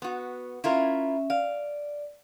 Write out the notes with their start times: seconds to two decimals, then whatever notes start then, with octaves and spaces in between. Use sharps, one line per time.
0.02 B3 F#4
0.64 C#4 E4 F4 A#4 E5
1.30 D5 F5